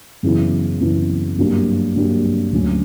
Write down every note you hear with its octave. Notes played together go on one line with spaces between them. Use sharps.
F#2 C#3 E3 B3 E4
F#2 C#3 E3 B3 E4
G2 F#3 A#3 D4 G4
G2 F#3 A#3 D4 G4
D2 D3 F#3 C#4